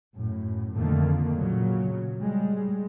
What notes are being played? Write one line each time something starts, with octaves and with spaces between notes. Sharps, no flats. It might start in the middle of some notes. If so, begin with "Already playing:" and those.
F#2 A2
F2 D3 D#3 A3 A#3
A#2 C#3 F#3
G3 G#3